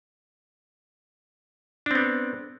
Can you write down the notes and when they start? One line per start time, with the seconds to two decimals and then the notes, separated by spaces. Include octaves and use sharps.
1.86 D4
1.91 C4
1.95 B3